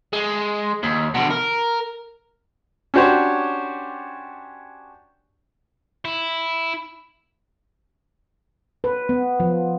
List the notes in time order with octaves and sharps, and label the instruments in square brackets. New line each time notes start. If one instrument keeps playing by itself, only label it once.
[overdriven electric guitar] G#3
D#2
B2 D3
A#4
[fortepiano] C#4 D4 F#4 G4 C5 C#5
[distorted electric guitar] E4
[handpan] B4
B3
F3